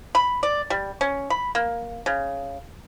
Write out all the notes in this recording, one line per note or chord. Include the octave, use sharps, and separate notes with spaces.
B5
D5
G3
C#4
B5
A#3
C#3